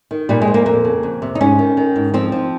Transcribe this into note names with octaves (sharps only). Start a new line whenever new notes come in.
D#3
A#2 G3
G#3
F3
A#3
F2 A#3
C#3
F2
C3
D#4
G#2 C#4
D#3
D#3
G#2
F3 C4
F3